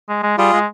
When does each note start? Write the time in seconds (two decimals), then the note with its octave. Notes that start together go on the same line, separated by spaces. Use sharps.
0.09 G#3
0.23 G#3
0.38 G3 F4 G#4
0.53 G#3